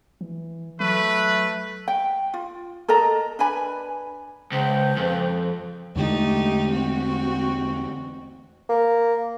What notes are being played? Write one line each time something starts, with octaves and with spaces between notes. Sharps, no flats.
E3
F#3 A3 B4
G5
F4
A4 A#4 D#5 A#5
D4 B4 G#5 B5
C#2 C5
F2
E2 D3 G#3 A3 D#4 G4
C4 F#4
A#3